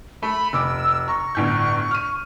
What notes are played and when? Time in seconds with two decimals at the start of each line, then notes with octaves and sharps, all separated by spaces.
0.23 A3 B5
0.53 F1 D6 E6
1.08 A#5 C#6
1.35 G1 A2 G6
1.91 F6 D#7